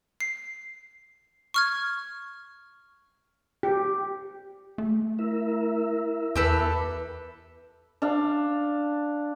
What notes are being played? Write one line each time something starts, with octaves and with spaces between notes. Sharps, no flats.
C7
C#6 F6 G#6
G4
A3
E4 A#4 E5
E2 G4 A4 B4
D4 F5